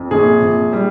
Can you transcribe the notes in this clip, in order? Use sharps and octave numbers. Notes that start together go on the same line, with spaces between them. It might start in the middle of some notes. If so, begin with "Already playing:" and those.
Already playing: F2
A#1 G#4
A#1
G3